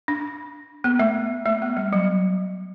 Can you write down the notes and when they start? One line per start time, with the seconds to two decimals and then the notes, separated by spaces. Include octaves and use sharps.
0.08 D4
0.84 B3
0.99 A3
1.46 A3
1.62 B3
1.77 G3
1.93 F#3